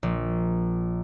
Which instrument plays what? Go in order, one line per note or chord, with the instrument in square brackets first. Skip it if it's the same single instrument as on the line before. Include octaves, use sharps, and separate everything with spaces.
[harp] A#1